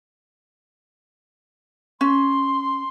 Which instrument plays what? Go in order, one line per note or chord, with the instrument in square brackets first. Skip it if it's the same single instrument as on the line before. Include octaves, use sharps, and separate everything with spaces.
[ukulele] C#4 [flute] C6